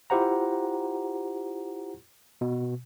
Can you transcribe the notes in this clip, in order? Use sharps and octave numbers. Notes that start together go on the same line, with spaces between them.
E4 F4 G4 C5 F#5 A#5
B2